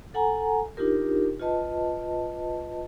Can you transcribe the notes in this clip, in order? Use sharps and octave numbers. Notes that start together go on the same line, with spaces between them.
A4 F#5 G#5 A#5
D4 D#4 F4 G4 A#4
F4 B4 D#5 A5